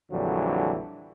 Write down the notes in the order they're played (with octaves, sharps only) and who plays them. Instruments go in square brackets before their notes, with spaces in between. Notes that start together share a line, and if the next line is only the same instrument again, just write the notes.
[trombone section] A#1 F2 D3 E3 F#3 G3